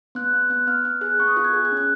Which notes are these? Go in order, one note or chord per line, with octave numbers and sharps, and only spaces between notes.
B3 F#6
B3
B3 F#6
B3 F6
B3 F6
G#4 F#6
B3 C#6
D#6
F4 F#6
G#6
G#4 F#6
G#6
C#4
F#6